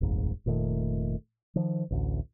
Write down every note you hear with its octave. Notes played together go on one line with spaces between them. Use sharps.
D#1 G#1 F2 G#2
F1 A#2 D#3 A3
D#3 F3
A1 D2